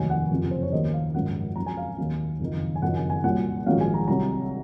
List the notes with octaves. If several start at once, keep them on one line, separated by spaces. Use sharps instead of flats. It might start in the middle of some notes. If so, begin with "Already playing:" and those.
Already playing: F1 D#2 D#3 F#3 G#5
F#5
F#1 F2 C3
F4
C5
C#5
D#2 D#3 F#3 D#5
F5
G#1 F#2 C#3 F3 F#5
F2 C#3 F#3 A#5
G#5
F5
D#2 D#3 F#3 F5
F#1 F2 D#3
G#5
F#1 F2 D#3 F#3 F#5
G#5
G#5
C2 A#2 F#3 F#5
A#1 G#2 D#3 F#3 F5
G#5
A#5
C2 C3 F#3 A#5